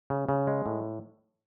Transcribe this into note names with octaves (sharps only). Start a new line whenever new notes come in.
C#3
C#3
G#3
A2